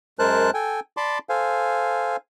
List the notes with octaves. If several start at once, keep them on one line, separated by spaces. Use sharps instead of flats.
F#2 G#3 A#4 C5 A5 F#6
A4 G5 G#5
D5 A5 B5 C6 D6
A4 C5 F5 G#5